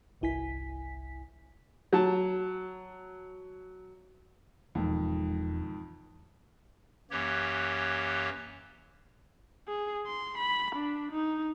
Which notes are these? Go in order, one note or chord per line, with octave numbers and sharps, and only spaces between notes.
G1 C2 E4 G#5 B6
F#3 A5
E1 F2 G#2 D#3
F#2 E3 A#3 G4 C#5
G#4
C6
B5
D4
D#4